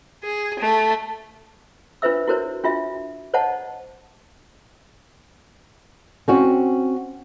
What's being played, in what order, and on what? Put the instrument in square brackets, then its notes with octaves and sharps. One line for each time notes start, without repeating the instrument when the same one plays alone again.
[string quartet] G#4
A3
[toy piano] D4 F4 B4 C5 E5 E6
E4 F#4 A#4 C5 C#5
D4 F4 F#4 E5
C5 C#5 D#5 F#5 A5
[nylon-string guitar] C4 C#4 F#4